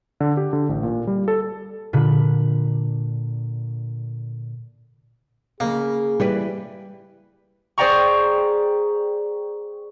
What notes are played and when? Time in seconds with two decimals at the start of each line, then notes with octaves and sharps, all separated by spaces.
0.20 D3
0.37 G4
0.53 D3
0.69 A1
0.83 A#2
1.07 G3
1.28 A4
1.93 A#2 D3 B5
5.60 C#3 A#3 G#4
6.20 E3 G3 E4 B4 D5
7.78 G#4 C5 D5 G5 A#5 C#6